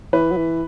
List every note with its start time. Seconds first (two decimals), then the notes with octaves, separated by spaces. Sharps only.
0.13 E3 B4
0.31 F#3
0.37 E3